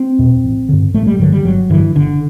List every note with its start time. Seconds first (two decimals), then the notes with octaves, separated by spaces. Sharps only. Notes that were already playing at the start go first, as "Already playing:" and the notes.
Already playing: C4
0.19 E2 B2
0.44 A1
0.69 G2 D3
0.94 A1 A3
1.07 G3
1.19 G2 D3 F#3
1.32 G3
1.45 G1 F#3
1.70 G2 D3 E3
1.95 G1 D3